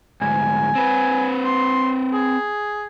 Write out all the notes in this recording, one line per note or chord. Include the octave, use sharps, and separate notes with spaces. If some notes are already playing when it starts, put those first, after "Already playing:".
D2 G#2 G#5
C4 B4
C6
G#4